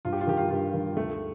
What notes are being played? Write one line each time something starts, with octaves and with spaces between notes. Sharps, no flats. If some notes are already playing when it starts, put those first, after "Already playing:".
G2 F4
G4
F4
D#3 G4
F4
G2 F4
D#3
D2 A3